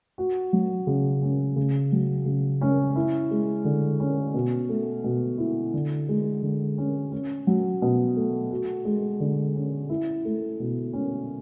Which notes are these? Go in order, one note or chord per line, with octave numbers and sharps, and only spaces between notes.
F#4
F#3
C#3
C#4
C#3
F#3
C#3
C#4
E4
G#3
D3
C#4
B2
A3
B2
E4
D3
G#3
D3
C#4
C#4
F#3
B2
A3
F#4
G#3
D3
C#4
E4
A3
B2
C#4